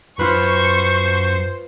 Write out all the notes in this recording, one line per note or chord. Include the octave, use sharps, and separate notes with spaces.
F#2 F4 B4 C5 C#6